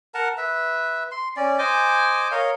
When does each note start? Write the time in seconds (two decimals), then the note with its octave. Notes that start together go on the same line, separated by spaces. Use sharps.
0.14 A#4 F#5 A5 A#5
0.38 B4 E5
1.11 C6
1.37 C#4 D5
1.59 C5 D#5 G#5 D6
2.31 A#4 C#5 D#5 F5